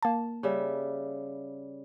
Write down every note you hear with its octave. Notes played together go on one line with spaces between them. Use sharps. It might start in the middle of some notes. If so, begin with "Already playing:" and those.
A#3 A5
C#3 G3 E5